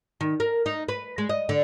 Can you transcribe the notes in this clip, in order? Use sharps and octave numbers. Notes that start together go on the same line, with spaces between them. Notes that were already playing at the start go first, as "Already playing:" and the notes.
D#3
A#4
D#4
B4
G#3
D#5
D3